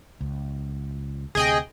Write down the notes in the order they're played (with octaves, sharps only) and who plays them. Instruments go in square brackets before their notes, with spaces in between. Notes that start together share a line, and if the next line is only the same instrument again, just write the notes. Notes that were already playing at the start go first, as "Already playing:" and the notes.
[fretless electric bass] C#2
[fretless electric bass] D2 C3 [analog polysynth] G#4 D#5 G5